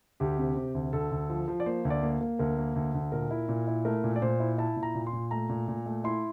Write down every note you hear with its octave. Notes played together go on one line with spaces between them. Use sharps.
D2 G4
C3
C3
D2
D2 A4
D2
F3
F3
D5
A#3 C5
D2
D5
A#3
A#3
D2 A#4
A#3
D2
D2
A#2 A#4
E4
A#2
E4
A3 A#4
A#2
D5
A#2 C5
E4
E4 A5
A#2
A#5
A#2
C6
A#2
A3 A#5
A#2
A#2
A3
E4 C6